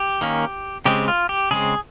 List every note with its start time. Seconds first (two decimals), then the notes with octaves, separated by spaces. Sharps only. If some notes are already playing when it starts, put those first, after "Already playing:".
Already playing: G4
0.21 D#3 A#3 C#4
0.85 C#3 G#3 C4 G4
1.08 F4
1.29 G4
1.51 C#3 G#3 C4 G#4